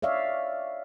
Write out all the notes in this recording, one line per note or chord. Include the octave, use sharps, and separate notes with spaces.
C#5 D5 E5 F5